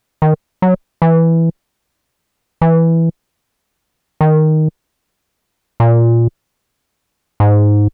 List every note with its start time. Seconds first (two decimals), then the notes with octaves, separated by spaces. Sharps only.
0.22 D#3
0.62 F#3
1.02 E3
2.62 E3
4.21 D#3
5.80 A#2
7.40 G#2